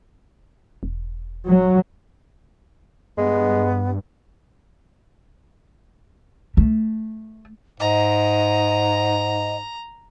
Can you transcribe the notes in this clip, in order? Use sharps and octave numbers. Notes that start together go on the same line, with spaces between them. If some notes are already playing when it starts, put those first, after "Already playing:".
E1
F#3
G2 G#3 B3
A3
G#2 D#5 A#5